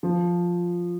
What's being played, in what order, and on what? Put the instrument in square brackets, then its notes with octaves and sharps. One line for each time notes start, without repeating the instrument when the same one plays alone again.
[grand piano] F3